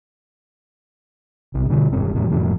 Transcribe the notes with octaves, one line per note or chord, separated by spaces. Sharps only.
B1 C3
D2 B2 D3
E1 G2 C4
E2 A2 F3
D1 F2 A2 F3